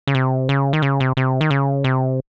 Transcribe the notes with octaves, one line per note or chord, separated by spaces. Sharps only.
C#3
C3
C#3
D#3
C#3
C3
C3
D#3
C#3
C3